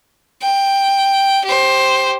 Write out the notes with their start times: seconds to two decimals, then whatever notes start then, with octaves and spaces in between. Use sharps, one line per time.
0.42 G5
1.45 G4 C5